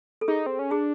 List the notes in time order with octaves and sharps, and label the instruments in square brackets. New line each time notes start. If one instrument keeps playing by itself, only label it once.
[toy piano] A4
[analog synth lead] D#4 [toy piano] G#4
[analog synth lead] C4
C#4
[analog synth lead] D4 [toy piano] G#4